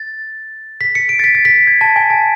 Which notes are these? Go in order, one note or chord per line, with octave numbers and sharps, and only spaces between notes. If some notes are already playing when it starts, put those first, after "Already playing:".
Already playing: A6
B6
C#7
D7
A6
B6
A6
B6
G#6
A5
G#5
A5